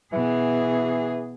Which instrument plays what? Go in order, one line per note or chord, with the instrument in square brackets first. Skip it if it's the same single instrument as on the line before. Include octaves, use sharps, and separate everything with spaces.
[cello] B2 G#4 [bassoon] E3